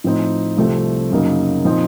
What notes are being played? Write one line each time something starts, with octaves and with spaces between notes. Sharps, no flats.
A2 F3 C4 D#4
C2 C3 F3 A3 C4
F#2 C#3 F#3 A#3 D#4
A#2 F3 C4 D#4